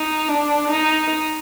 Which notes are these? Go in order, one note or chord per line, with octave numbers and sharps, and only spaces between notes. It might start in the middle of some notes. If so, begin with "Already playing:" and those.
Already playing: D#4
D4
D#4